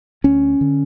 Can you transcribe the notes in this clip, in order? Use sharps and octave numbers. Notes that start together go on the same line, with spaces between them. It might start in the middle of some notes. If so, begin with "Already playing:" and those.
D2 C#4
D3